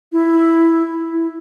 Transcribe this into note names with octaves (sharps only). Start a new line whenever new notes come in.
E4
E4